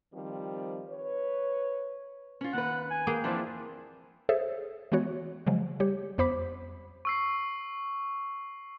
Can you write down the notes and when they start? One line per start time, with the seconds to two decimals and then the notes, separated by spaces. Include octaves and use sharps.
0.14 D#3 F3 G3 C4
0.89 B4 C#5
2.41 C#4 F4
2.53 D#2 B4 F#5
2.91 G#5
3.07 A#3 G#4 G5
3.24 F2 E3 F3 D4 E4
4.29 G#4 A4 C5 C#5 E5
4.92 E3 G#3 B3 F#4 C#5
5.47 C#3 F3 F#3 G#3
5.80 G3 G4 C#5
6.18 F2 B3 C5 B5 D6 B6
7.05 C#6 E6 C7